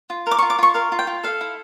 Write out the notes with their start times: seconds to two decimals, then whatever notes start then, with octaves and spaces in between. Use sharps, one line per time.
0.10 F4
0.27 A#4 D6
0.38 C#6
0.42 F4
0.50 D6
0.59 F4 C#6
0.74 A#4 F5
0.92 F4
0.99 G5
1.07 F4
1.24 A4 F5
1.41 E4